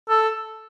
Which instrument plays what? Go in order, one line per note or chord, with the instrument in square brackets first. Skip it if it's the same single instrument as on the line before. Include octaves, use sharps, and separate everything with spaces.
[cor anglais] A4